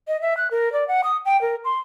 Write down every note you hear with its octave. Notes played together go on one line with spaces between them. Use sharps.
D#5
E5
F#6
A#4
D5
F#5
D#6
G5
A#4
C6